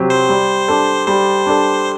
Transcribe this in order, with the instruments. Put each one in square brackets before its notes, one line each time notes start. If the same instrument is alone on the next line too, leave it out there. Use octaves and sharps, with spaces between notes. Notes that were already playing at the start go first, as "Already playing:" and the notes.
Already playing: [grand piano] C3 F#3 C4 G4
[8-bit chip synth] C5
[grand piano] G3
D4 A4
[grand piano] G3 [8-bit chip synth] C5
[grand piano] D4 A4